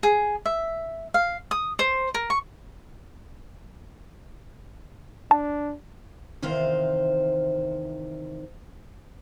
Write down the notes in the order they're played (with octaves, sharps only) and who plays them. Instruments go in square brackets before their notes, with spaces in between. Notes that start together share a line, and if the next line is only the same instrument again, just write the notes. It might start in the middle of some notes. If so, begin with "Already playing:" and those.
[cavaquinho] G#4
E5
F5
D#6
C5
A#4
C#6
[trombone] D4 [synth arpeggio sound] A5
[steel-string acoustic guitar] E2 C3 D#3 C5 F5